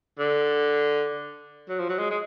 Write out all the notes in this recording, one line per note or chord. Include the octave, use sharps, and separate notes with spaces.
D3
F#3
F3
F#3
G#3
G#3